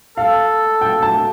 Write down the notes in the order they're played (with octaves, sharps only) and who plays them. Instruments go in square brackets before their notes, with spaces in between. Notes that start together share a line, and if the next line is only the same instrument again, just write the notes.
[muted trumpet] A4 [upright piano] F5
[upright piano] G5
A5